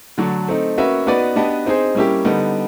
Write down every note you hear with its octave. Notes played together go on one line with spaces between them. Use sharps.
D3 F#3 A3 D4
A3 C4 D#4
A#3 C#4 F#4 B4 E5
B3 D#4 F#4 B4 D5
B3 D4 G4 B4 D#5
C4 D#4 G#4 C5
G3 A#3 C#4 E4 G4
D3 G3 B3 D#4